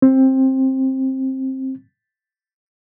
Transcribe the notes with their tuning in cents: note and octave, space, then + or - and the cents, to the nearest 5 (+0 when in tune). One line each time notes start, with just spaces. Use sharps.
C4 +15